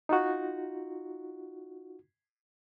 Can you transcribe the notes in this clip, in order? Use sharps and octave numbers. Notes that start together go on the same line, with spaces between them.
D#4 F4 F#4